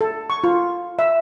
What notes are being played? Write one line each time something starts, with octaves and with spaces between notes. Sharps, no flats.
A4
C#6
F4
E5